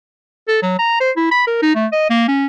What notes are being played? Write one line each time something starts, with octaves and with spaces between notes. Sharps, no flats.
A4
F#3
A#5
C5
E4
B5
A#4
D#4
A3
D#5
A#3
C#4